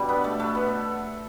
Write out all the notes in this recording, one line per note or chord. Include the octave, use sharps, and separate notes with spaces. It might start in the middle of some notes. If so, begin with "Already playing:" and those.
Already playing: B2 G3 D4
B3 B4
A3 A4
A3 A4
B3 B4